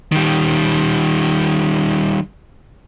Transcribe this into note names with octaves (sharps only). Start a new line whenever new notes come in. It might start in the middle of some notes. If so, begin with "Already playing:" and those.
D#3 G3